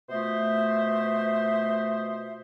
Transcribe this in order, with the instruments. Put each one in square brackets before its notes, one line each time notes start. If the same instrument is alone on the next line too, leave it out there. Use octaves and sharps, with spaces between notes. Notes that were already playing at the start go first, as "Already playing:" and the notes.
[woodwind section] B2 A3 F4 C5 D#5 E5